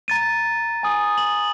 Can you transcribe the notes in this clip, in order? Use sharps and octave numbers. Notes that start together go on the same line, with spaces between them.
A#5 A6 D#7
G#5 D#6
F#7